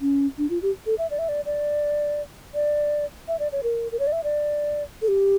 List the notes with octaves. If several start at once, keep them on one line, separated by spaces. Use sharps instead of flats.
C#4
D4
F4
G4
A4
E5
D5
E5
D5
D5
D5
E5
D5
C#5
A#4
A#4
C#5
D5
E5
D5
A4
G4